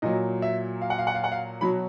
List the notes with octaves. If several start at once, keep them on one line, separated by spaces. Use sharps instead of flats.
A#2 F#3 D#5
E5
F5
F#5
F5
F#5
F5
F#5
F5
B2 F#3 B5